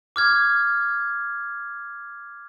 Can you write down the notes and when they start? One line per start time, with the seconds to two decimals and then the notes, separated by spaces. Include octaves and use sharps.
0.16 D6 F6 G#6